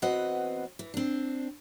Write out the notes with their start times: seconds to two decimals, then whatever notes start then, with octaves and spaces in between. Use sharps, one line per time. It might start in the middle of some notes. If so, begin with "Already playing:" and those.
0.02 E2 B3 C4 F#4 B4 D#5
0.79 E3
0.94 C4 D4